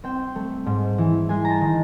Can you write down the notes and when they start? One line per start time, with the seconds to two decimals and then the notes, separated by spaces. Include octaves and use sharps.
0.04 C4 G5
0.36 A3
0.66 G#2
0.98 E3
1.29 G#3 G#5
1.45 A#5
1.50 A5
1.61 D#3